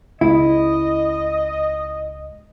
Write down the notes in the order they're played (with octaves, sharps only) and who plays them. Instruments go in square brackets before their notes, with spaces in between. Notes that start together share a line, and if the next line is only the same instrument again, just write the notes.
[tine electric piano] C#2 [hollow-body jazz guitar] E4 [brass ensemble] D#5